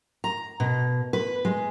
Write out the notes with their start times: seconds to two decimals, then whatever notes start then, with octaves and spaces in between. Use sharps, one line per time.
0.24 A#5
0.60 B2
1.13 B4
1.45 G#3